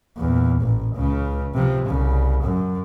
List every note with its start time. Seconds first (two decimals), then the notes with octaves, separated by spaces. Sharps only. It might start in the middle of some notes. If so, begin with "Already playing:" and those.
0.17 E2 A#2
0.62 A1
0.96 C#2 C#3
1.54 C3 F3
1.86 C2 C#3
2.42 F#2